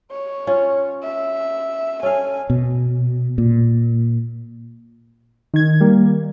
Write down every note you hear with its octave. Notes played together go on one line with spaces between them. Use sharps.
C#5
C#4 F4
E5
C#4 A4 F5 G#5
B2
A#2
D#3 G#6
G3 A#3